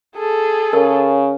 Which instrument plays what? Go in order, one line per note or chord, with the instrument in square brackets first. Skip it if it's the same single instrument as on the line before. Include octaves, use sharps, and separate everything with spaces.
[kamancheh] G#4 A4
[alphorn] C#3 [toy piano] A#4